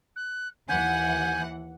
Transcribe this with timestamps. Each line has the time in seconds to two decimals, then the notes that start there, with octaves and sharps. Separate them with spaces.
0.16 F#6
0.69 D#2 E3 F#5 G#5 G6